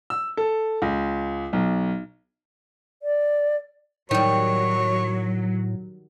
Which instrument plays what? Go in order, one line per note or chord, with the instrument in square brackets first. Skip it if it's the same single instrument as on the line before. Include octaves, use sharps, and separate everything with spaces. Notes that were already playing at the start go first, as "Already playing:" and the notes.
[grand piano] E6
A4
C#2
B1
[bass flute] D5
[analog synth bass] A2 [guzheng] D#3 G3 [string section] F#3 [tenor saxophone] C#5